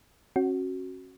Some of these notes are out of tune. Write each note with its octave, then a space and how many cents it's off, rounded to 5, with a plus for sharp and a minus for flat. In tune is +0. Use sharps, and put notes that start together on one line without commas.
C#4 -35 F#4 +0